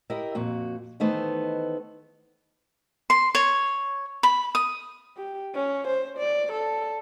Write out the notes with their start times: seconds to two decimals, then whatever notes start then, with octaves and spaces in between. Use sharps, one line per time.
0.10 E4 G4 A#4 D#5 E5
0.35 F2 A#2 F#4
1.00 D#3 E3 A3 B3 D#4 C5
3.10 C6
3.35 C#5
4.23 B5
4.55 D#6
5.17 G4
5.55 C#4
5.88 C5
6.18 D5
6.52 A4